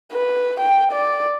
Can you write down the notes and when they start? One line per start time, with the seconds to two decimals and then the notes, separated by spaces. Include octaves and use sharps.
0.12 B4
0.60 G5
0.92 D5